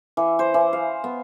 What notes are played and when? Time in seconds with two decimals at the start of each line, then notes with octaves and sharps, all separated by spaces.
0.17 E3
0.39 C5
0.54 E3
0.73 F5
1.04 B3